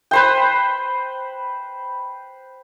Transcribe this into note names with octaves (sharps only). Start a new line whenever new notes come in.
B4 C5 G5